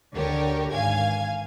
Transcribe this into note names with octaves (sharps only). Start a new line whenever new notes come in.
D2 D3 G4 A#4 C#5
G#1 F5 G#5 G#6